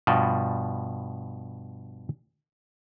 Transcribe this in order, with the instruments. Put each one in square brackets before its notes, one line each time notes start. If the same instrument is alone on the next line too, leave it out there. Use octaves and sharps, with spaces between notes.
[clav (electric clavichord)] G2 B2 F3